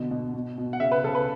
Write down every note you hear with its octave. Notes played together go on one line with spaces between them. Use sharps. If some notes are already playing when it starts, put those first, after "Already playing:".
Already playing: B2 D3
B2
B2
B2
F#5
C#3 E5
B4
C#3 A4
B4